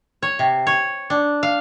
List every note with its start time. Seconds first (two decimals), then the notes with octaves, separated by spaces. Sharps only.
0.22 C#5
0.39 C3
0.67 C#5
1.10 D4
1.43 F5